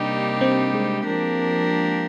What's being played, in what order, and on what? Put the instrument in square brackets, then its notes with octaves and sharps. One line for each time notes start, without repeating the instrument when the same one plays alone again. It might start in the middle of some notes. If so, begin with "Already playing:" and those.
Already playing: [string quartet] C3 G3 A#3 D#4 G4 [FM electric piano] D4
[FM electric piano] C4
G#3
[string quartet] F3 A#3 D4 G4 A#4